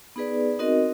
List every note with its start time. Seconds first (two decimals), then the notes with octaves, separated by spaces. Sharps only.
0.16 B3 D#4 G#4 B4 D5
0.59 C4 D#4 F#4 A#4 D#5